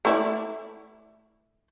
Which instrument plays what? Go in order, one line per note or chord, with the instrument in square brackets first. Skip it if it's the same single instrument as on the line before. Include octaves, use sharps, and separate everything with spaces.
[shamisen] A3 E4 D5